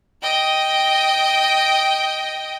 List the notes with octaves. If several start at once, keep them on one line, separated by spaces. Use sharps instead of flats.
D#5 G5